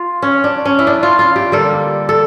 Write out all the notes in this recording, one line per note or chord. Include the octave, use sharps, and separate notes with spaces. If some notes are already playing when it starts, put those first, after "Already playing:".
Already playing: F4
C#4
D4
C#4
E4
D4
F4
F4
G4
D3 G3 A#3 A4
A4